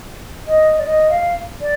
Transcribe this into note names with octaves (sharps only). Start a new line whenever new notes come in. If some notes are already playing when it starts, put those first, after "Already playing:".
D#5
D5
D#5
F5
D5